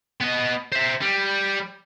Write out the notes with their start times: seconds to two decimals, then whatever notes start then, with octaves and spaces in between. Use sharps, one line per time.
0.21 B3 D#5
0.72 C5 E5
1.01 G3